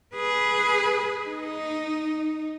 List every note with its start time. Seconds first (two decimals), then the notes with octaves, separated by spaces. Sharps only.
0.15 G#4 B4
1.28 D#4